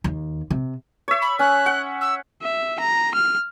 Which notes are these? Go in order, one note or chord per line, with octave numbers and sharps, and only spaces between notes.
D#2
C3
C#5 E5
B5
C#4 F#6
F#5
E6
E5
A#5
F6